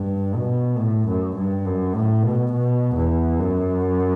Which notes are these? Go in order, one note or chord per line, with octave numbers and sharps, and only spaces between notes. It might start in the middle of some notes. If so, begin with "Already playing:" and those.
Already playing: G2
B2
A2
F#2
G2
F#2
A2
B2
B2
E2
F#2